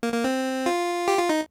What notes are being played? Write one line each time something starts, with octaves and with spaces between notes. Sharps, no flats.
A#3
A#3
C4
F4
G4
F4
D#4